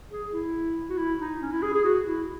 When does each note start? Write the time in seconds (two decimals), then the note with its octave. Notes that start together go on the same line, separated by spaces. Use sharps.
0.11 G#4
0.33 E4
0.89 F#4
0.97 E4
1.19 D#4
1.41 C#4
1.52 E4
1.62 G#4
1.73 G#4
1.84 F#4
2.06 E4